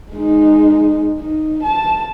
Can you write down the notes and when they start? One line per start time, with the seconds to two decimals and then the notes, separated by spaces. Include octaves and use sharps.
0.12 G#3 D#4
1.19 D#4
1.63 A5